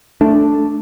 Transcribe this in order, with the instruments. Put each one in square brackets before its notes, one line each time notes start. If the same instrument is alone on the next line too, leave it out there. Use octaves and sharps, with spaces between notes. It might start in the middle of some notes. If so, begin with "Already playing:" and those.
[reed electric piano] A3 [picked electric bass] D4